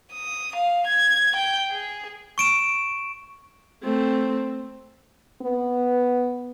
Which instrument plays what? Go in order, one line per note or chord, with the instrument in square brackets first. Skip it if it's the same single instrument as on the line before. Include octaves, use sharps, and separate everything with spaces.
[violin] D#6
F5
G#6
G5
G#4
[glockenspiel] C#6 D7 E7
[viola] A3 C4
[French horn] B3